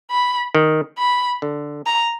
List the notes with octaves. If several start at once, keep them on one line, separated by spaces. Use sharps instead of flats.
B5
D#3
B5
D3
A#5